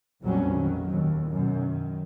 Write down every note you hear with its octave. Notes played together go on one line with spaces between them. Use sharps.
A#1 F2 F#3 G3 C#4
D#3 F#3
D#2
F#2 B2
D#3